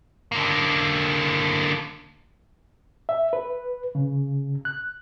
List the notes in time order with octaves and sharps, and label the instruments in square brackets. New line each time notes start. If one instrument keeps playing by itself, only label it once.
[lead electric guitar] D3 A#3
[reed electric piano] E5
B4
C#3
F#6